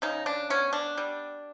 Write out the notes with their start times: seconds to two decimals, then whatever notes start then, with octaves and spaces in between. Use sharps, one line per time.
0.02 C#3 D#4
0.26 D4
0.50 B3 C#4
0.73 D4
0.97 G3